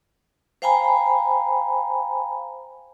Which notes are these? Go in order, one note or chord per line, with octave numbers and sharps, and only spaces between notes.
C5 F5 G5 G#5 A#5 B5